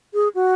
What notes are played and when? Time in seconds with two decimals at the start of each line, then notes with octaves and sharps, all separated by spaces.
0.14 G#4
0.35 F#4